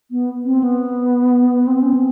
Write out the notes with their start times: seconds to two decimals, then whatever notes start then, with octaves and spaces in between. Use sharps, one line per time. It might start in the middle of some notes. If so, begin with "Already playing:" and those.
0.11 B3
0.45 C4
0.63 B3
1.67 C4
1.82 C#4
1.94 C4